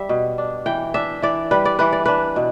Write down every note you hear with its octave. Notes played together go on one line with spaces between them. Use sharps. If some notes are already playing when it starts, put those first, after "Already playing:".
Already playing: G3 E5
B2
D4
E3 G5
D4 E5
E3 D5
G3 B4
D5
E3 B4
D5
D4 B4
B2